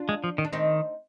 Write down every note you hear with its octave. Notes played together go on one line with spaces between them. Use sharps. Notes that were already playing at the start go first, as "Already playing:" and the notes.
Already playing: D4 F4
G#3
F3
D#3
D4
D#3 C4 D#4